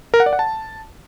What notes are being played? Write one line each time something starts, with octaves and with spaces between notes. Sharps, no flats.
A#4
F#5
D5
F#5
A5